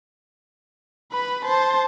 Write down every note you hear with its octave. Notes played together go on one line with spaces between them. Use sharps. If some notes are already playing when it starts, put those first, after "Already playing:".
B4 B5
C5 A5